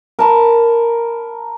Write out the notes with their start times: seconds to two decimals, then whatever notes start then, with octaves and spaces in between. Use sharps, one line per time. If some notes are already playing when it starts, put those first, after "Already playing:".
0.19 A#4 A5 B5